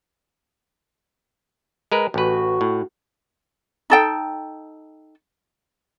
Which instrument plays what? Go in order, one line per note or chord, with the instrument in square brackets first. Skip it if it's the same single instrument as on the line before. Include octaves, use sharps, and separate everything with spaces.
[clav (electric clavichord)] G#3 A#4 B4
[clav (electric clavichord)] A1 B4 [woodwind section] F#4
[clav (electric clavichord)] A2
[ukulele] D#4 A4 G5